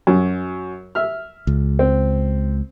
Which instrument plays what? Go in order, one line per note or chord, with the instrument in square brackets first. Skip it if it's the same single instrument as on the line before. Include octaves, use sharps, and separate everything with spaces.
[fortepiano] F#2
E5 F6
[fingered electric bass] C#2
[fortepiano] C4